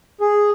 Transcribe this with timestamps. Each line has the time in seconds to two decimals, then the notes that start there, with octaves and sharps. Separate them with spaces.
0.21 G#4